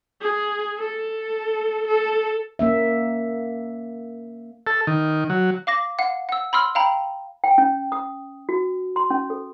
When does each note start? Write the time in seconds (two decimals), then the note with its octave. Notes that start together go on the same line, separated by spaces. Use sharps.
0.21 G#4
0.78 A4
1.88 A4
2.59 A#3 C#4 E5
4.67 A4
4.87 D#3
5.30 F#3
5.67 F5 D6 A#6
5.99 F5 F#5
6.29 F#5 E6
6.53 B5 C6 E6 F6
6.75 F5 G5 A#5 B5
7.44 G5
7.58 C#4
7.92 D#6
8.49 F#4
8.96 C6
9.10 C#4
9.30 A4